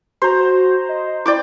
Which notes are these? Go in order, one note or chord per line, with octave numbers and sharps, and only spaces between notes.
F#4 C5 A#5
D#5
E4 D5 G5 D6